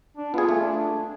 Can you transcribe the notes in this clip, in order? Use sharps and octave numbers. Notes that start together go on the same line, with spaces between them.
D4
B3 F4 G#4
A3
D4